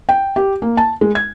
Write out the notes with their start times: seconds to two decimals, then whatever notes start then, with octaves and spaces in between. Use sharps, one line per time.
0.09 G5
0.36 G4
0.62 A#3
0.77 A5
1.01 G#3
1.15 G#6